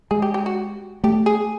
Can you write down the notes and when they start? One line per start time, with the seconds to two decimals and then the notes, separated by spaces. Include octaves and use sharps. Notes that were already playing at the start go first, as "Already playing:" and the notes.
0.11 G#3 G#4
0.22 G4
0.34 G4
0.46 F#4
1.04 A3 G4
1.26 G#4